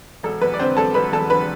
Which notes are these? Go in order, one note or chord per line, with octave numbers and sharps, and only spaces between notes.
E1 A4
E2 B4
D5
D3 C4 C5
E1 A4 A5
E1 B4 B5
E2 A4 A5
D3 B4 B5